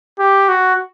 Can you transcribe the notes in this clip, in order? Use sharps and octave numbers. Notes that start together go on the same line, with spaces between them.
G4
F#4